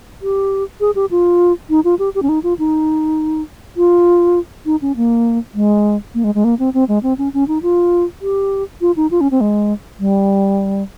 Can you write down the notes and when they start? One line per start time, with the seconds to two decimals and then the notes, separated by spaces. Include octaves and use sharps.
0.22 G4
0.81 G#4
0.95 G4
1.11 F4
1.70 D#4
1.84 F4
1.99 G4
2.15 G4
2.23 C#4
2.29 D#4
2.43 F4
2.59 D#4
3.77 F4
4.66 D#4
4.82 C#4
4.97 A#3
5.55 G#3
6.15 A#3
6.24 G#3
6.35 G#3
6.44 A#3
6.59 C4
6.74 C4
6.88 G#3
7.03 C4
7.18 C#4
7.34 C#4
7.48 D#4
7.62 F4
8.22 G4
8.81 F4
8.96 D#4
9.11 F4
9.21 C#4
9.31 C4
9.41 G#3
10.00 G3